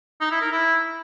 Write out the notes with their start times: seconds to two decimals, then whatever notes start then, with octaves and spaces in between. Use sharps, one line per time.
0.21 D#4
0.31 E4
0.41 A#4
0.52 E4